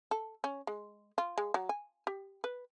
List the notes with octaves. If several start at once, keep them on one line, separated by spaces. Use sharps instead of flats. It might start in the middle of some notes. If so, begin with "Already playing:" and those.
A4
C#4
G#3
F4
G#3
F#3
G#5
G4
B4